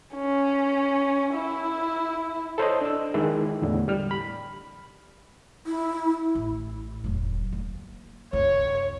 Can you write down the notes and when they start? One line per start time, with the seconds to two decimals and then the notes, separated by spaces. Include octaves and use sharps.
0.16 C#4
1.34 E4
2.58 A4 C5 C#5 D#5
2.82 D4 E6
3.14 D#3 G#3 E4
3.62 E2 A2 D3
3.88 G3 F6
4.11 B5
5.66 E4
6.35 A1
7.04 E1 F#3
7.52 A#3
8.33 C2 F#2 C#5